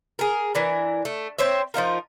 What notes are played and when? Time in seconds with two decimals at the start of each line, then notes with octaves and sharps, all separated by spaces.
0.19 G#4 A#4
0.55 E3 D4 A#4
1.05 A3
1.38 C4 C5 C#5 E5
1.74 F3 D#4 F4 A#4